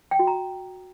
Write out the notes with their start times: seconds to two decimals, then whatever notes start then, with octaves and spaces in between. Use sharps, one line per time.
0.11 G5
0.19 F#4
0.27 A#5